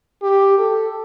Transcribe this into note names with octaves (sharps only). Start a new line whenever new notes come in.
G4
A4